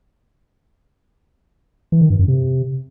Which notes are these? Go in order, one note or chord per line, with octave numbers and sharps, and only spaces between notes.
E3
D#3
G2
F#2
C3